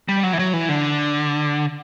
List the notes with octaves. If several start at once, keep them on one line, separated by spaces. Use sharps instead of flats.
G3
F#3
E3
F#3
E3
D3